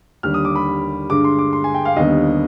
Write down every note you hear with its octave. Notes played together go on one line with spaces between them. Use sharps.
D#2 D3 G3 F6
D#6
D6
B5
G2 D3 G#3 D6
C6
D6
C6
G#5
G5
F5
D#2 D3 G3 B3 D#5